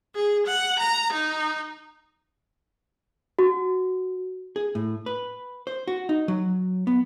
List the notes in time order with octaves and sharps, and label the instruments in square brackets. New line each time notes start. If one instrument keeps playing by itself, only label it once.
[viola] G#4
F#5
A#5
D#4
[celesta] F#4
[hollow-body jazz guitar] G#4
A2
B4
C5
F#4
D#4
F#3
B3